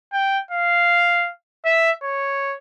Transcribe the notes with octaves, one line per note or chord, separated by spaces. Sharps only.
G5
F5
E5
C#5